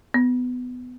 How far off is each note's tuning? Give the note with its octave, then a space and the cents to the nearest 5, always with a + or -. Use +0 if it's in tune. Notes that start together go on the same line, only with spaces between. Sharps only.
B3 +20